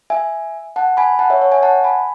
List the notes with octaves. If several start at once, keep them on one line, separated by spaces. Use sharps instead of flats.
E5 G#5
F#5 A5
G#5 B5
F#5 A5
C#5 E5
C#5 E5
E5 G#5
F#5 A5
G#5 B5